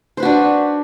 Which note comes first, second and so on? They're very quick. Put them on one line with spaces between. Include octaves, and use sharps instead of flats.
C5 B4 F#4 D4